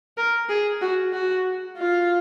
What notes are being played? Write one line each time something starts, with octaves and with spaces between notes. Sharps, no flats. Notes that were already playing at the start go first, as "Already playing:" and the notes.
A#4
G#4
F#4
F#4
F4